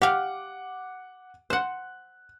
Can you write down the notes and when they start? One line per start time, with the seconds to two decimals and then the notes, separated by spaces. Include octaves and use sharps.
0.02 G4 F5 F#5 D6
1.50 C5 F#5 F#6